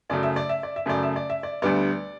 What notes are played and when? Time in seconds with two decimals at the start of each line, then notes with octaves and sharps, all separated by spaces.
0.09 F#2 C#3 F#3 A3 D5
0.23 E5
0.36 D5
0.49 E5
0.63 D5
0.76 E5
0.86 F#2 C#3 F#3 A3 D5
1.03 E5
1.16 D5
1.30 E5
1.43 D5
1.62 D2 D3 G3 B3 D5